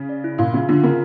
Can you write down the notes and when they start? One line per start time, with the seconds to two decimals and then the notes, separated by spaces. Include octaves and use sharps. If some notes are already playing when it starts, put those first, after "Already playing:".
Already playing: C#3
0.09 D5
0.24 E4
0.38 A#2 F4
0.54 C#3 E5
0.69 D3 F4
0.83 C#3 A#4